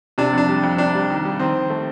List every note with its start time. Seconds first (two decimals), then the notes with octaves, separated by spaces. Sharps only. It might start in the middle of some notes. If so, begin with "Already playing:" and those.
0.18 C3 D4
0.33 F2 D4
0.48 G3
0.63 F2
0.78 C3 D4
0.95 G3
1.10 D#3
1.25 G3
1.39 D#3 C4
1.55 D#3
1.70 A3